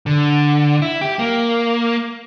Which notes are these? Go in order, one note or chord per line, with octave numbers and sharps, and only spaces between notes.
D3
E4
G4
A#3